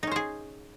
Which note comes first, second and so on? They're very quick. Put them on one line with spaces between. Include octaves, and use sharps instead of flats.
D#4 C#4 C5 G#4